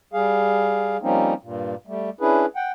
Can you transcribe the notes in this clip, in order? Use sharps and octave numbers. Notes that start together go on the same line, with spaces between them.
G3 G#4 F5
F3 G3 A#3 C4 C#4 D#4
G2 A#2
G3 A3
C#4 D4 E4 G#4 B4
F#5 G5